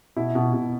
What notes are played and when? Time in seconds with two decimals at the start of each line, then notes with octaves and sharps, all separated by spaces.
0.16 B2 E4
0.35 B2
0.53 B2